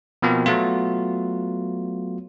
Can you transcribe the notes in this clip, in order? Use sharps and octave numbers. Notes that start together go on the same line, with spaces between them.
B2 F3 A#3 C4
F#3 A3 B3 F4